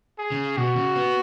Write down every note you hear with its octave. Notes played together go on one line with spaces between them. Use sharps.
G#4
C#3
B2 F#4
C#3
B3